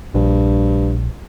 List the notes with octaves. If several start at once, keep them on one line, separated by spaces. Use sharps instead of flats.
A#1 G2